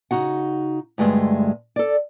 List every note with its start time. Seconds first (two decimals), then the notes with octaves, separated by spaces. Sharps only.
0.11 C#3 D#4 F#4 F#5
0.98 D2 G2 G#3 A3
1.76 A4 D5